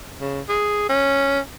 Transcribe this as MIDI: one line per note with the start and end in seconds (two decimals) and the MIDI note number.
0.21 0.41 49
0.49 0.88 68
0.89 1.40 61